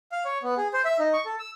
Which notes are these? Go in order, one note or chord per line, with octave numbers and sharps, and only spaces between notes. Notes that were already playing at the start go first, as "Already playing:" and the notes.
F5
C#5
B3
G#4
C5
E5
D#4
C#6
A4
E6